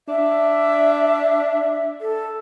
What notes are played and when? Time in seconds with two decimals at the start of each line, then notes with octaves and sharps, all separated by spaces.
0.08 D4 E5
2.01 A4